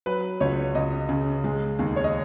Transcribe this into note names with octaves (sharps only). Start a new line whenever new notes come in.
F#3 B4
C#2 C#5
C#2 D#5
C#3
G#3
D#2
C#5
D#5